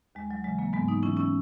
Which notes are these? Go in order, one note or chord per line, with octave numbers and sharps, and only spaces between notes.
D#2 G#3
F#3
C#3 E3 G#3
F#3 A#3
G#2 G#3 B3
B3 D#4
E3 C#4 E4
C#4 E4